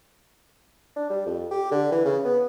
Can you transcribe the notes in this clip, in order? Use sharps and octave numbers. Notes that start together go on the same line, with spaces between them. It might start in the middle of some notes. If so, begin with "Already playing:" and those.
D4
G3
F2
G4
D3
E3
C#3
B3